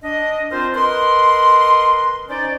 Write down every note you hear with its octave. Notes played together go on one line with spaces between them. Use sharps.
D4 D#5
C4 D4 F4 A#4 C5
A#4 B4 D#5 C6
C#4 D#4 C5 D5